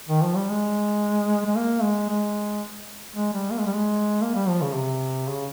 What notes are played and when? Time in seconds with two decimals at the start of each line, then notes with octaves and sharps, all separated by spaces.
0.09 D#3
0.22 F3
0.36 G3
0.50 G#3
1.45 G#3
1.56 A#3
1.82 G#3
2.09 G#3
3.16 G#3
3.33 G3
3.51 A#3
3.59 G#3
3.66 G3
3.74 G#3
4.22 A#3
4.35 G3
4.48 F3
4.62 C#3
4.74 C3
5.28 C#3